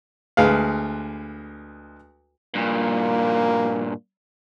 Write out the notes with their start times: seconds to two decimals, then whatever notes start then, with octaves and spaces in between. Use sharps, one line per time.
0.37 D2 G#3 B4 F5
2.55 G2 A#2 A#3